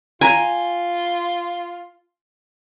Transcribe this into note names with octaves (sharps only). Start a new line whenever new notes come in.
F4 G5 G#5 A#5